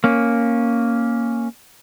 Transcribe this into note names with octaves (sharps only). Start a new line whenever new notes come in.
A#3 C#4